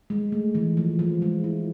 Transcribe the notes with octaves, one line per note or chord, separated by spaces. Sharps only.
G#3
A3
E3
F3
F3
G#3
E4